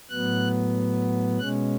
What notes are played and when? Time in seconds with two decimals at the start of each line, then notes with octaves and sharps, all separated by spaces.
0.10 A2 F#3 B3 F#6
1.39 B2 G#3 C#4 F#6